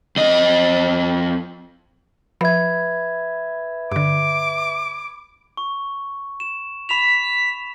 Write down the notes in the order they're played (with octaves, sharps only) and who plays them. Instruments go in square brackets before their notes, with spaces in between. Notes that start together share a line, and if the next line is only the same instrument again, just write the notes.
[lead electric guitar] F2 D#5
[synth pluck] F3 [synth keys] B4 E5 [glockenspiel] B5 G#6
[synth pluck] G2 D3 [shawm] D6
[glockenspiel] C#6
E7
[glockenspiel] B5 E7 F7 [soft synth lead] B6